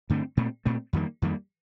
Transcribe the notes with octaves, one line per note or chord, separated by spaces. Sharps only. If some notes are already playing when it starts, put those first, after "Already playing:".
G2 D3 A3 C4
A#2 A3 C4
A#2 A3 C4
F2 D#3 G3 A#3
F2 D#3 G3 A#3